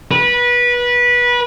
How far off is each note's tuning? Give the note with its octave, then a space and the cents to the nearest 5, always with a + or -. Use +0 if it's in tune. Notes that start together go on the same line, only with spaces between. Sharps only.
B4 -20